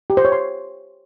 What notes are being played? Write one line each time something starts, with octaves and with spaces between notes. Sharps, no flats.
G4
C5
C#5
C6